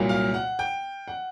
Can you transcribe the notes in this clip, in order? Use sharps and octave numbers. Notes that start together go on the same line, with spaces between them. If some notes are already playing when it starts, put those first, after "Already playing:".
Already playing: C2 A#2 F#3 A#3
F5
F#5
G5
F#5